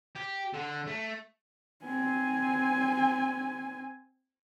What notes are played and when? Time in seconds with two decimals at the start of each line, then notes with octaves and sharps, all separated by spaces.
0.16 G4
0.54 D3
0.87 A3
1.85 C4 G#5